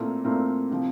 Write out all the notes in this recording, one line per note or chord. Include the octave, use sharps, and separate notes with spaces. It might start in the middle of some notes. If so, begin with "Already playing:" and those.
Already playing: A#2 A3 C4 E4 A#4
A#2 A3 C4 E4 A#4
C3 F3